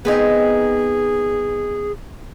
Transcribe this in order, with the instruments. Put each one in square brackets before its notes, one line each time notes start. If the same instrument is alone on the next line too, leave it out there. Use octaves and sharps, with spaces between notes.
[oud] B3 C4 D#4 [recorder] G#4